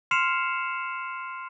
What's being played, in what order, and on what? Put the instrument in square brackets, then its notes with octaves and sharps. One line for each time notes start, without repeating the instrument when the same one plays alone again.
[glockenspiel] C6 F6 C7 C#7 E7 F7